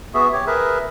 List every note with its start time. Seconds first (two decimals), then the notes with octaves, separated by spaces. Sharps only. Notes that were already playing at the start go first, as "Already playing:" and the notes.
0.14 B3 F#4 G#4 E5
0.33 G4 C#5
0.47 G#4 A#4 B4 E5